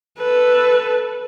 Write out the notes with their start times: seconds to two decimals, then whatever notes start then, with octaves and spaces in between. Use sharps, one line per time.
0.18 A4 B4